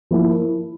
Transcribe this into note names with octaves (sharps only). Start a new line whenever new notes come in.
F3 A#3 E4